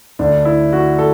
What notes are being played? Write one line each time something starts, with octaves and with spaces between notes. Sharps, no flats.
D2 D3 D4
E4
F#4
A4